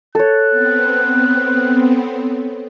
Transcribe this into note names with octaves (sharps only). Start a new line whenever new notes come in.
A4 C#5 F#6
B3 C4